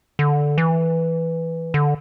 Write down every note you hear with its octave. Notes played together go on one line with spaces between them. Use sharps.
D3
E3
D3